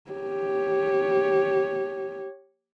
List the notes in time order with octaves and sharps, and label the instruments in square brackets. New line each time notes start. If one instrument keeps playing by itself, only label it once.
[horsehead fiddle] G4 C#5